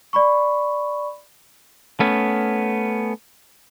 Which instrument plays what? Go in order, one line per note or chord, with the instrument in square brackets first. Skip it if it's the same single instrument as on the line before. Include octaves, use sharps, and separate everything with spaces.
[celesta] D5 B5 C#6
[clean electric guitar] A3 B3 C#4